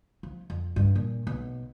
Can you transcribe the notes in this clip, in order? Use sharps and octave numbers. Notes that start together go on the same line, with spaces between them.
F3
F2
G2
A#2
B1